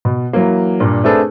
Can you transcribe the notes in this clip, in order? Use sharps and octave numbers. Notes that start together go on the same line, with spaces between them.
B2
E3 F#3 A#3
G2 A#2
A3 C4 D4 G#4 A4 B4